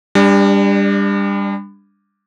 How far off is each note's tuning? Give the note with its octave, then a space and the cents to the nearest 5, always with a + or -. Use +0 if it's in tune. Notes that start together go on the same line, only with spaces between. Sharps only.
G3 +30 D4 +0